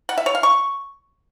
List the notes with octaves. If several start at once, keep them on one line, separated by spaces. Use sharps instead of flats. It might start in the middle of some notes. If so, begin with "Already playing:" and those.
F#5
E5
C#5
F5
C#6